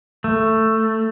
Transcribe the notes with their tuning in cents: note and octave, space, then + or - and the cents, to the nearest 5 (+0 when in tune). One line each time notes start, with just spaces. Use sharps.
A3 +10